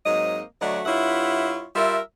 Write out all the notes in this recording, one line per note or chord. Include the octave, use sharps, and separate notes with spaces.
G#2 F#3 A#3 C4 D#5
D2 F#3 A3 F#4 D5 D#5
G2 E4 F4 C#5 E5 F#5
G3 F4 A#4 E5